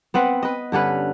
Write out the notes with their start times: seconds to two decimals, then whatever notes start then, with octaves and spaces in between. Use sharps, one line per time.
0.14 B3 C4 B4 F#5
0.43 B4 D#5
0.72 G2 D3 C#4 B4